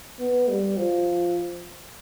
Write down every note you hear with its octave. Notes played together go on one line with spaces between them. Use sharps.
B3
G3
F3